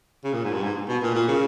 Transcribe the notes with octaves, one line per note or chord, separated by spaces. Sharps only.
C#3
A#2
G#2
G2
G#2
B2
A#2
A#2
C#3